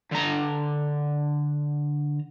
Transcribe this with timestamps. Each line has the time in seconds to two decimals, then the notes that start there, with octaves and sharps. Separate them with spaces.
0.12 D3 A#5